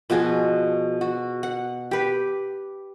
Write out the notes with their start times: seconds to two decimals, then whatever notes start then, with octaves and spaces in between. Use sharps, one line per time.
0.10 B2 F3 F#4 G#4
1.01 F#4
1.43 F#5
1.91 G4 B4